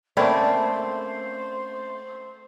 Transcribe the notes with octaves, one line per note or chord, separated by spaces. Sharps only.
A3 A#3 C4 C#4 C5 D5 G5 B5